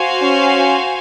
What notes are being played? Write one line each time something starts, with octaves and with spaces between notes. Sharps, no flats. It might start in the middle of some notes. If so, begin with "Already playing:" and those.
Already playing: F#4 C5 F5 G#5
C#4